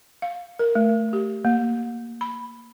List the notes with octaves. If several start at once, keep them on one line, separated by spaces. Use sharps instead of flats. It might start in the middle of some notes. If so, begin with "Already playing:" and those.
F5
A#4
A3
G4
A#3
B5